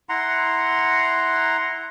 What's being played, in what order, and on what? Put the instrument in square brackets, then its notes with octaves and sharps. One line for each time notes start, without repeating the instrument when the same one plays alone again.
[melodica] E4 F#5 A#5 C6